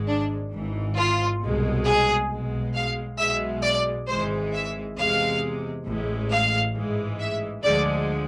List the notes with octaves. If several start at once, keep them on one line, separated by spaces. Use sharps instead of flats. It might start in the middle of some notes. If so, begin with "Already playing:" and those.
Already playing: G#1 G#2 G#3
D4
G#1 G#2 E3
F4
C2 B2 G#3
G#4
B1 B2 G#3
F5
B1 B2 G#3 E5
D5
G#1 G#2 E3 G#3 C5
E5
E2 C3 G#3 F5
A1 A2 G#3
F5
A1 G#2 E3 G#3
E5
D2 D3 F3 G#3 D5